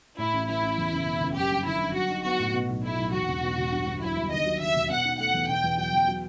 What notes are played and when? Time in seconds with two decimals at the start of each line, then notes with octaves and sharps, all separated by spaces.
0.18 A2 E4
0.33 A1
0.48 E3 E4
0.63 A1
0.78 E2
0.92 F#1
1.07 B2
1.21 F#1
1.36 F#2 G4
1.51 G1
1.65 D#3 E4
1.80 G1
1.95 F#3 F#4
2.10 D#4
2.25 B3 F#4
2.39 A2
2.54 B2
2.69 B1
2.83 A3 E4
2.98 B1
3.12 E2 F#4
3.28 E1
3.42 B2
3.57 E1
3.72 G2
3.87 G1
4.01 F#3 E4
4.16 G1
4.31 D#2 D#5
4.46 F#3
4.60 D#3 E5
4.75 E1
4.89 B2 F#5
5.04 D#4
5.19 A3 F#5
5.34 E2
5.49 B2 G5
5.63 E2
5.78 F#3 G5
5.93 E2
6.08 F#3